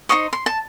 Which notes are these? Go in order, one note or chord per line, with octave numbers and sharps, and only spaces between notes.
D#4 F#4 C5 D#5 C#6
C6
A5